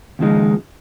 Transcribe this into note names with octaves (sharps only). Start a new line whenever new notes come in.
D#2 C#3 F3 G#3 D#4